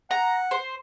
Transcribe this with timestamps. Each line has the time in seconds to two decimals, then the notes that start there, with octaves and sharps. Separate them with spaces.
0.11 F#5 A#5
0.51 C5